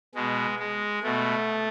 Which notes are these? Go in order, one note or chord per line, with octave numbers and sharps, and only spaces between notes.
B2 G#3
G#3
B2 A3